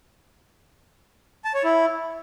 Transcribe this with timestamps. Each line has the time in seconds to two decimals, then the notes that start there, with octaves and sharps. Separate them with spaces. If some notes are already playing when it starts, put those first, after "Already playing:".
1.45 A5
1.54 C#5
1.64 E4